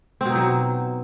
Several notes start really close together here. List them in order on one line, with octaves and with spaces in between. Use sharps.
C4 B2 D#4 F#3